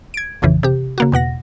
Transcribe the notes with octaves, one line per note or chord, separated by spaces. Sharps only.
G#6 D7
A1 F2 C#3 E3
C3 G4
C#3 A#3 F#4
E2 B2 F#5 A#6